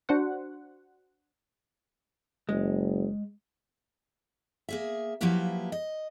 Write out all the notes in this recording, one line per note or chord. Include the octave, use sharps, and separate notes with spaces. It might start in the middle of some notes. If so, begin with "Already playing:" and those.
D4 F#4 C5 F#5
F#1 G#3
A#3 G#4 E5
F3 F#3 A#3 E4 G4 B4
D#5